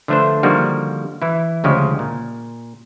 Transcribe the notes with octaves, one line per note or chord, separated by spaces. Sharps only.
D3 F3 A3 D4 B4 C5
D3 D#3 F3 G3 A#3 F#4
E3 E4
D2 C#3 F3 G#3 G4
A#2